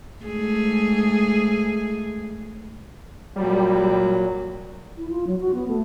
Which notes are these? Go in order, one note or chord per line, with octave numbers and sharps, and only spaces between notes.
G#2 A3 G#4
A#2 F#3 G3
E4
F4
F#3
F#4
B3
A3